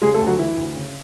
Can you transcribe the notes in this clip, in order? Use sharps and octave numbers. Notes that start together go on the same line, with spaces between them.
C#3 G#3 G#4
A3 A4
D2
F#3 F#4
E3 E4
D2
C#3